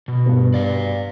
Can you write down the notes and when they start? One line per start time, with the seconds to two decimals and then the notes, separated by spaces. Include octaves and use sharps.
0.08 B2
0.26 G2 B3
0.54 D5 F5